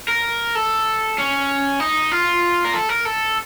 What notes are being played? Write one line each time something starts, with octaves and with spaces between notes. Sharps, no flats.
A#4
A4
C#4
D#4
F4
A#4
A4
A#4
A4